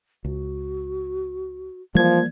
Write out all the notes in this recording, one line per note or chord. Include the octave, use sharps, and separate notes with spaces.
C#2 F#4
E3 F3 G3 G#3 A#3 D5 G#6